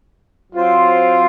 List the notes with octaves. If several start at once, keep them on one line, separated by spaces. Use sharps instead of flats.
F#3 C4 F4 C5